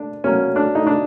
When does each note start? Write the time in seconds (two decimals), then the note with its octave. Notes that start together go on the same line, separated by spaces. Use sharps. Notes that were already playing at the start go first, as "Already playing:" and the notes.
Already playing: D4
0.24 B2 F#3 A#3 C#4
0.56 D4
0.75 D#4
0.87 D4